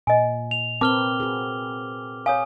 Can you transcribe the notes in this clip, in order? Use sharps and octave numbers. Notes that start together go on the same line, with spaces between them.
A#2 D#5 G#5
F7
C4 A#4 B4 A5 D6 F6 G7
F#4 G#4
C#5 F5 G#5 D#6